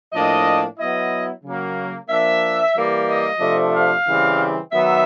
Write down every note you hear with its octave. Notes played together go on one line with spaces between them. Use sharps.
A2 F3 A#3 D4 D#5
F#3 B3 E4 D#5
C#3 F#3 A#3
F3 A#3 D4 E5
E3 G3 A#3
D#5
C3 F3 A3 D4
F5
C#3 E3 G3 C4
D#3 F#3 B3 D#4 E5